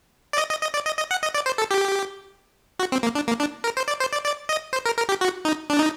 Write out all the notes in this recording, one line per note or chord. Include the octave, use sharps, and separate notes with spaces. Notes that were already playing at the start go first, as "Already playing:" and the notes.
D5
D#5
D#5
D#5
D5
D#5
D#5
F#5
D#5
D5
C5
A4
G4
F#4
C4
A#3
D4
A#3
D4
A#4
C5
D5
C5
D5
D5
D#5
C5
A#4
A#4
G4
F#4
D#4
D4
D#4